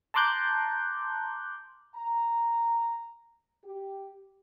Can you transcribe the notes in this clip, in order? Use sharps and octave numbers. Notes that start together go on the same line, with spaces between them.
A5 A#5 C6 D6 F#6 G6
A#5
G4